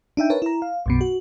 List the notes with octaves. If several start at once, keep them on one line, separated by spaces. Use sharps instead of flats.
D4 D#4 E5 G5
A#4 B4 C#5 A5
E4 A#5
F5
B1 F#2 B2
F#4